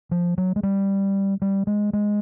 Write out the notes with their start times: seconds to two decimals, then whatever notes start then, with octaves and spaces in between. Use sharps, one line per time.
0.11 F3
0.38 F#3
0.56 G#3
0.63 G3
1.42 G3
1.67 G#3
1.93 G#3